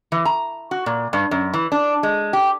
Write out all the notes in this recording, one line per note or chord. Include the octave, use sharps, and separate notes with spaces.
E3
A#5
F#4
A#2
G2
F#2
E3
D4
G#3
G4